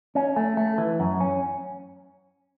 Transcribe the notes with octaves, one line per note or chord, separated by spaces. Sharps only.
C#4
A3
A3
E3
F#2
C#4